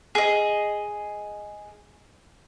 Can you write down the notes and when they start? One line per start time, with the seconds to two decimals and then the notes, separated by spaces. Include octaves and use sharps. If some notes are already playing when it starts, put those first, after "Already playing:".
0.15 G#4 D#5